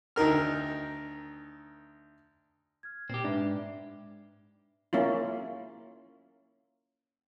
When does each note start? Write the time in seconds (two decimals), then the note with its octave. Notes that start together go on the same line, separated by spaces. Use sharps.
0.16 D2 D#3 D#4 A#4 F6
2.83 F6 G#6
3.10 A#2 C4 G4
3.24 G#2 D4 B4 E5 B5
4.93 A#3 C#4 E4 F4